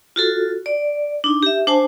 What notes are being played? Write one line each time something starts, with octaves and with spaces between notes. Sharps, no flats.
F4 F#4 A4
D5
D4 D#4
G4 E5
D4 C5 G#5 A5 D6